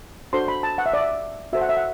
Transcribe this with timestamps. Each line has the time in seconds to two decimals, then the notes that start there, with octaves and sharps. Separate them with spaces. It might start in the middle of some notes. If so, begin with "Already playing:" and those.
0.33 D4 F#4 A4 C5 C6
0.48 B5
0.63 A5
0.78 F#5
0.86 E5
0.94 D5
1.01 E5
1.53 F#4 A4 C5 E5
1.61 F#5
1.69 E5
1.77 F#5